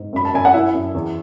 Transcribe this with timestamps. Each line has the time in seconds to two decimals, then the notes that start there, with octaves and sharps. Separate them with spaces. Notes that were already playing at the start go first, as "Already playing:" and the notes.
Already playing: G#2
0.13 F#2 B5
0.25 A5
0.34 F#2 G#5
0.45 F#5
0.54 F#2 E4 E5
0.73 F#2
0.95 E2